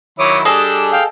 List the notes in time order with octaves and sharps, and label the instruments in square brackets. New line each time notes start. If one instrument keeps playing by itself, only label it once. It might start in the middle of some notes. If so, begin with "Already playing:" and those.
[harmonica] D#3 F#3 E4 [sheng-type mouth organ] C#5 D6 D#6
[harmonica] G3 D4 [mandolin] G#4 A4 D#5 [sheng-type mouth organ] E6
[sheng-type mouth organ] F5 G5